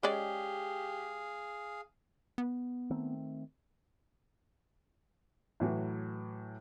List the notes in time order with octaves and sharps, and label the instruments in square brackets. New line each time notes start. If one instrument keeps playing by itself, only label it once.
[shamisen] G#3 C#4 D5 [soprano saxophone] G4 [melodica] G#4 F5
[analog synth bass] B3
[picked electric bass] D#3 A3 C4
[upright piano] A2 E3 F#3